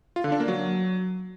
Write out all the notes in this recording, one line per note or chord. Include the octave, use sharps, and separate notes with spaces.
F4
D3
D4
A#3
F#3